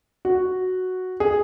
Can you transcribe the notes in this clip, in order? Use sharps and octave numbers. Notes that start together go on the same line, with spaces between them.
F#4
G#4